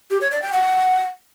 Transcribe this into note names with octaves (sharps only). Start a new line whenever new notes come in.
G4
C#5
D5
G5
F#5